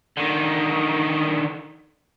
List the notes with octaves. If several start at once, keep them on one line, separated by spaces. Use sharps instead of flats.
D3 D#3